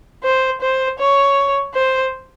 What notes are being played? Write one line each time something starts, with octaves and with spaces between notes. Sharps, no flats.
C5
C5
C#5
C5